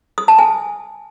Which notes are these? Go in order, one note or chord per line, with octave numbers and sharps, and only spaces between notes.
D#6
A5
G#5